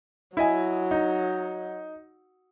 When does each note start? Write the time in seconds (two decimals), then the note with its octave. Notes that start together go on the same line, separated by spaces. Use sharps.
0.37 F#3 E4 D#5 G#5
0.91 D#4